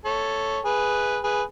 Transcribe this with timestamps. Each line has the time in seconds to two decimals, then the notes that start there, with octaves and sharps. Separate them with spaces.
0.05 A4 C#5
0.64 G#4 B4
1.24 G#4 B4